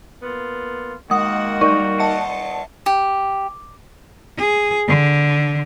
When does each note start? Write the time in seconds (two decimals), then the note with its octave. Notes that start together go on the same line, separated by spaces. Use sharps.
0.22 A#3 B3 F4
1.11 D#3 G#3 A#3 F#4 F#5 D#6
1.61 G3 D#4 A#4 D5 C#6
2.00 D#5 E5 F#5 A5 C#7
2.86 G4
4.38 G#4
4.88 D3